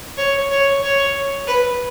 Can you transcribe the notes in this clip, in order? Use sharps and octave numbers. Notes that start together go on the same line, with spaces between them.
C#5
C#5
C#5
B4